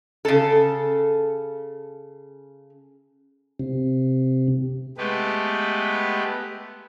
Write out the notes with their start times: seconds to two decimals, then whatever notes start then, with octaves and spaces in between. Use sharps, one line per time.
0.25 C#3 A4
3.60 C3
4.98 G#3 A3 B3 G4 B4